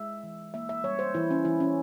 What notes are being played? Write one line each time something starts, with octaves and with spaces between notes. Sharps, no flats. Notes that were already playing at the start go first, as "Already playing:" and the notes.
Already playing: G#3 E5
E3
A#3 E5
E5
G3 C#5
C5
E3 E4
C#4
E3 E4
C#4